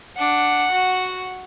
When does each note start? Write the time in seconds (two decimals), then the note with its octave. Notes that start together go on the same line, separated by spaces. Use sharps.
0.18 D4 F#5
0.71 F#4